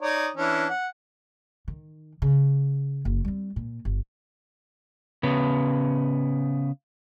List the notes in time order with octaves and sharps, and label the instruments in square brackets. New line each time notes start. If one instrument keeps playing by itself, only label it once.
[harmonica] D#4 C#5 D5
E3 C#4 D4
F#5
[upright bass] D#3
C#3
F#1
G3 C4
A#2
G1
[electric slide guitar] C#3 B3